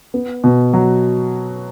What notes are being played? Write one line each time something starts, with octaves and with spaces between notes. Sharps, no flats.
B3
B2
F#3